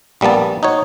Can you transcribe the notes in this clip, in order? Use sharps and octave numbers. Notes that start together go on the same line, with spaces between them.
A#1 G3 A#3 B3 A5
D#4 F#4 C#5